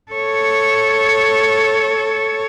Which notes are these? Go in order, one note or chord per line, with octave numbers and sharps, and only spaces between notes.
A4 C#5